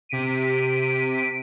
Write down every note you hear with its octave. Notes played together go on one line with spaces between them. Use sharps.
C3 B6 D7 D#7